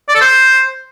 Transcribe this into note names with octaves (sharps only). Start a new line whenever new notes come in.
D5
A4
C5